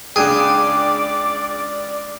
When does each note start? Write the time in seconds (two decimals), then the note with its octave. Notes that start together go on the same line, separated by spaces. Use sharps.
0.16 C#2 D4 G#4 D5 G5 D6